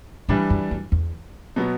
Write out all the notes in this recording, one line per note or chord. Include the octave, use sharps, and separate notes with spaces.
A2 E3 G3 D4
F#2
F#2
E2
B2 F#3 B3